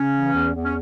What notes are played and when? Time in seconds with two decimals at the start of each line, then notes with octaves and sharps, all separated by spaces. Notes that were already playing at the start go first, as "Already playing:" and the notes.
Already playing: C#3 C#4
0.13 E3
0.33 E2
0.54 E2
0.64 C#4